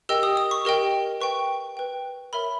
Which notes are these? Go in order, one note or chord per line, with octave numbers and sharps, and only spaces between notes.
G4 A#4 D#5 G5 E6
D#6
D#6
C#6
G4 A#4 D#5 G5
B4 G5 C#6
B4 G5
A#4 C#5 E5 B5